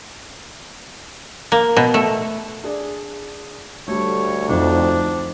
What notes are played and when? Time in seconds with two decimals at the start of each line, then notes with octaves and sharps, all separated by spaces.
1.52 A#3
1.77 B2
1.94 A3
2.63 D4 G#4 D5
3.88 D2 G3 A3 C#5
4.49 F2 D4 D#4